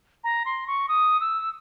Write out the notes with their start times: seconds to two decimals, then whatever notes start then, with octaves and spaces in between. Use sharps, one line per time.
0.24 A#5
0.46 C6
0.67 C#6
0.89 D#6
1.21 E6